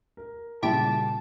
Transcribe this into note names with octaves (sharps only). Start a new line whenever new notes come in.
A#4
A#2 C#3 G3 E4 G4 A5 D7